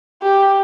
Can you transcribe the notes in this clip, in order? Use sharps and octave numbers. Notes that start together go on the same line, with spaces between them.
G4